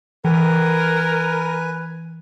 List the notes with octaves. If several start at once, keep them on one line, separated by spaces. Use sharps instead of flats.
E3 A#4 B4 G#5